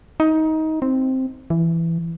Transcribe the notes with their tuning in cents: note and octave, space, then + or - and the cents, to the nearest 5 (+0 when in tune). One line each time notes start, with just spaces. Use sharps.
D#4 +20
C4 +0
E3 +10